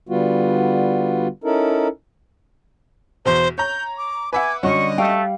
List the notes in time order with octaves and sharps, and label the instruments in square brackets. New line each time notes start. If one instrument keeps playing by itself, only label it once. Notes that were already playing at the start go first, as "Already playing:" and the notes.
[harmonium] D3 G3 B3 F4 F#4
C#4 D#4 E4 A4 A#4
[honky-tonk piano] E2 B2 [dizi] C5
[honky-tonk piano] C#5 A#5 [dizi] G6
[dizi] D6
[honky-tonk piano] B4 E5 F#5 [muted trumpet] G#5 [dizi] D6
[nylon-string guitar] D3 G3 [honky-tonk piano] C#4 D4 F#4 [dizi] D#5 [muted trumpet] C#6
[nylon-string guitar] G3 F5 G5 [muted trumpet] A3